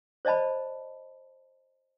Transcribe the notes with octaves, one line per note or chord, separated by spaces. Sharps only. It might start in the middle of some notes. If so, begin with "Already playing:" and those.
C5 D5 D#5 A5 B5